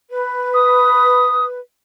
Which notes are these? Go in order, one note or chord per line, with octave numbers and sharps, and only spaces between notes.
B4
D#6